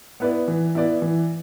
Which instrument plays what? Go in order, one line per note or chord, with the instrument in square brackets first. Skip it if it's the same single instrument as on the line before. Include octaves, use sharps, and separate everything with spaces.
[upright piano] B3 E4 B4 D5
E3
B3 E4 B4 D5
E3